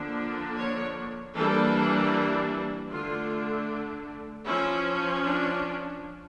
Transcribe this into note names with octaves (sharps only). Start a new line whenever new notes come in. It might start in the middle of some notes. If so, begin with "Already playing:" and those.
Already playing: D3 F3 A#3 D4
C#5
E3 G3 A#3 D4 A4
D3 A3 D4 F4
F3 C#4 E4
D4